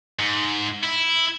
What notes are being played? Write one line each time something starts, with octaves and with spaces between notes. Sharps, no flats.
G#2
E4